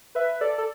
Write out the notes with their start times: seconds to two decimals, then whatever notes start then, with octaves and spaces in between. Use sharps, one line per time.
0.15 B4 E5
0.41 A4 D5
0.58 A4